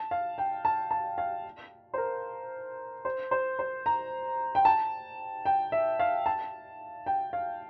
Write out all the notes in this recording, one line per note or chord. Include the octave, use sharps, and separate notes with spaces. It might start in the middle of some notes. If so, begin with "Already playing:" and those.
Already playing: A5
F5
G5
A5
A5
F5
C5
A#4
C5
C5
C5
A#5
G5
A5
G5
E5
F5
A5
G5
F5